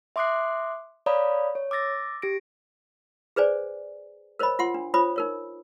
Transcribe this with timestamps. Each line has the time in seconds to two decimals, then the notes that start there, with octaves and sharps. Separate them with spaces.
0.16 E5 C6 D6 D#6 F#6 C7
1.06 C#5 D5 F5 A#5 B5 D#6
1.55 C#5
1.71 D6 E6 A6 A#6
2.22 G4 A#6 D7
3.36 G#4 B4 C5 D5 G#5
4.39 A#4 C5 C#5 D#5 B5
4.59 F4 F#5 C6
4.74 D4
4.94 F4 C5 C#5 B5 D#6
5.16 D#4 A#4 C#5